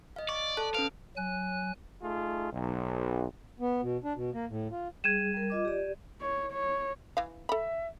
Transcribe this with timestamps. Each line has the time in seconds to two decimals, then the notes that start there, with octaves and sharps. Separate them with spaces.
0.16 D#5 F5
0.29 D5 C#6
0.57 A4 A5 F#6
0.75 C#4 B4 F5 D7
1.16 F#3 G#5 F#6
2.02 A3 D#4 F4 G#4
2.52 B1
3.60 B3
3.82 B2
4.04 D4
4.15 B2
4.34 A#3
4.49 A2
4.71 F4
5.04 G3 G#4 G#6 D#7 E7
5.34 G3 A#4
5.50 F4 D#5 D6
5.65 G4 D5
6.21 C#5
6.52 C#5
7.17 E3 F5
7.49 A4 E5 B5